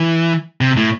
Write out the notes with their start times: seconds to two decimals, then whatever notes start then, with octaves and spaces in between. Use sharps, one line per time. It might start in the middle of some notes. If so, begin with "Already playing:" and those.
Already playing: E3
0.61 C3
0.77 A2